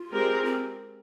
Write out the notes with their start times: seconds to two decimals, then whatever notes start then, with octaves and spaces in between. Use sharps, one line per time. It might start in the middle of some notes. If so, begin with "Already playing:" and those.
Already playing: F4
0.12 G#3 C4 G4 A#4
0.44 C4